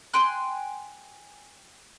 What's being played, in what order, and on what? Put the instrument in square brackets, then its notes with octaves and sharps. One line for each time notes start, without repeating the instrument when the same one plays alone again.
[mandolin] G5 G#5 C6 F#6